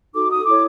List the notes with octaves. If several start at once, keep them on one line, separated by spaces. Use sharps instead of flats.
D#4 F#4 A4 D6
D#6
E4 A4 C#5 D6